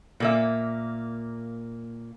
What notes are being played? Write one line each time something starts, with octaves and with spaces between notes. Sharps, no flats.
A#2 A#3 E5